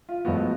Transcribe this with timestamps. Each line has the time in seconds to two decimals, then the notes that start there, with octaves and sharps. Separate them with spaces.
0.09 F4
0.25 B1 A2 F3 G#3 B3 F#4